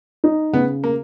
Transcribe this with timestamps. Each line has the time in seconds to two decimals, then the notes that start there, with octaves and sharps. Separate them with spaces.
0.24 D#4
0.53 C#3 B3
0.84 A#3